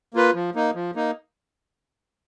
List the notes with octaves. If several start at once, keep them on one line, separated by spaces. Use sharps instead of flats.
A#3 F4 B4
F3
A#3 D#4
F3
A#3 D#4